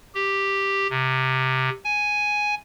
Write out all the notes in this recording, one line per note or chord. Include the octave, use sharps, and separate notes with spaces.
G4
C3
G#5